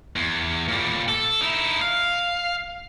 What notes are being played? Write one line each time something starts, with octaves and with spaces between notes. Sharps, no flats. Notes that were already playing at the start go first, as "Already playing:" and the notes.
E2
A#2 G3
A4
D#4 E4
F5